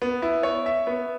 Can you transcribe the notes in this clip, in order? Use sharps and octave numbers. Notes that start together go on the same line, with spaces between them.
B3
E4
C#5
E5
B3